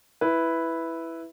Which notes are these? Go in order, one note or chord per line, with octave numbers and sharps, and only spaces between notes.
E4 B4